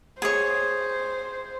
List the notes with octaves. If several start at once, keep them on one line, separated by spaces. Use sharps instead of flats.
G#4 C5 C#5